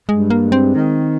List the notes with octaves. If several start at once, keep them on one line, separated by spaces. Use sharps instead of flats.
G2 G#3
A#3
G#3
C4
D#3